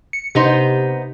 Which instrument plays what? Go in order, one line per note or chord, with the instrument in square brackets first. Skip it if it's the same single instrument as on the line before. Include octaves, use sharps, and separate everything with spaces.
[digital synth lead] C#7
[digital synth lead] C3 [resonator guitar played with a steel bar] B3 D#4 C5